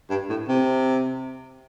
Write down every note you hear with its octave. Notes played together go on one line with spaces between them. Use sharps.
G2
A2
C3